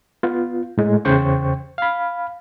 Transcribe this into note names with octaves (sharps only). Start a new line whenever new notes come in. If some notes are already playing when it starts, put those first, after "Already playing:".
B3 F4
A2 G#3
E2 C#3 C5 G5 C#6
F5 B5